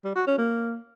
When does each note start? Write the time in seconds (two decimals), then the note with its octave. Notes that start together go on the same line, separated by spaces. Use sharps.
0.04 G3
0.16 F#4
0.27 C#4
0.38 A#3